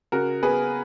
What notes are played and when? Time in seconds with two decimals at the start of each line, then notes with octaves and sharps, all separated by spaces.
0.12 C#3 F#4 A#4
0.43 B3 G#4 B4